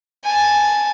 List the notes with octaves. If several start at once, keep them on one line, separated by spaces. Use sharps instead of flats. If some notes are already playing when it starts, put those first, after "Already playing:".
G#5 A5